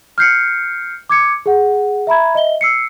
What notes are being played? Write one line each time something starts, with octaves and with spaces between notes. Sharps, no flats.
F6 G6 C7 C#7
D6 G#6 C#7
G#4 F#5
E5 A#5 B5 G#6
D#5 E5 G7
E6 C7 C#7